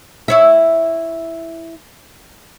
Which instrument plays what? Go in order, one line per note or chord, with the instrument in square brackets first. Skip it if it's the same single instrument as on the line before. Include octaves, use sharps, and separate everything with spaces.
[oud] E4 C#5 E5